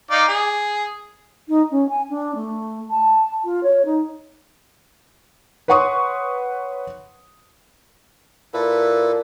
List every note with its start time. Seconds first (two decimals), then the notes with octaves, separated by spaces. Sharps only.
0.11 D#4 D5 F5
0.28 G#4
1.48 D#4
1.70 C#4
1.89 G#5
2.09 D4
2.34 A3
2.90 A5
3.44 F4
3.63 C#5
3.85 D#4
5.68 B4 C#5 F#5 C6 C#6 D#6
8.54 A#2 E4 A4 B4